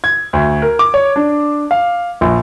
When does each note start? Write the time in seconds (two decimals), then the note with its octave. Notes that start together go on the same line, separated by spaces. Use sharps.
0.04 G#6
0.33 D2
0.62 A#4
0.79 D6
0.94 C#5
1.16 D4
1.71 F5
2.21 A#1